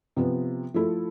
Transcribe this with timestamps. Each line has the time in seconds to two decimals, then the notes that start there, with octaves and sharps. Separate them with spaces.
0.16 C3 F3 B3
0.74 F3 A3 E4 A4